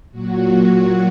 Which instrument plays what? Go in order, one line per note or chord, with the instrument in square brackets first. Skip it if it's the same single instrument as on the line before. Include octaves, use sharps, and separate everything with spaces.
[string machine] A#2 F#3 F#4